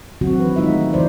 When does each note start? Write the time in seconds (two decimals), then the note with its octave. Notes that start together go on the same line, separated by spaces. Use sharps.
0.21 D3 D#3 F#3 C4 F#4
0.39 E3 B4
0.56 D#3 G#3 D#4 F4 E5
0.69 A3
0.93 D3 E3 C5 D5